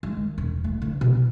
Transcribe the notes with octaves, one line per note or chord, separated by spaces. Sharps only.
G#3
D#3
E1
A3
D3
B2